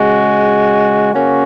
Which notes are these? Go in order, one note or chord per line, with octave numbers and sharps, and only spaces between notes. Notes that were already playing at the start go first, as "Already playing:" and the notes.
Already playing: C#3 G#3 F#4
C#3 A#3 C#4 F#4